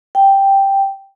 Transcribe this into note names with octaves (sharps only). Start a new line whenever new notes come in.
G5